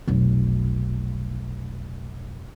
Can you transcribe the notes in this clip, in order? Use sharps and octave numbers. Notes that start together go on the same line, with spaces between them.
F1 B1